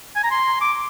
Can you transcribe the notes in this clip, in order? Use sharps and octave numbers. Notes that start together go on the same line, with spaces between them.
G#5
A#5
C6
D6